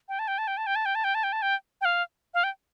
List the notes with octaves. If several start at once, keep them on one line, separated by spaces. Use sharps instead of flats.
G5
A5
G5
A5
G5
A5
G5
A5
G5
A5
G5
A5
G5
A5
G5
G5
F5
F5
G5